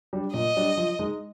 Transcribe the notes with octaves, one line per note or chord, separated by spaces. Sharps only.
G3 D4
A#2 D#5
G3 D4
F3
G#3 D#4